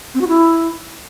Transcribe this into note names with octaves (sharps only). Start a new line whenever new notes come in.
C4
F#4
E4